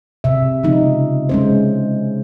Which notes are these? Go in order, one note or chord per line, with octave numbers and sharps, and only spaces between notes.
C3 E5
C#3 F3 G#3 D#4
G#3 C#4 C5